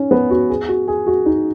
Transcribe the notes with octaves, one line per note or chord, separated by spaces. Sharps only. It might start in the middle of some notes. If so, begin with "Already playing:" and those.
Already playing: C#4 D#4
B3
F#4
G#4
F#4
G#4
F#4
D#4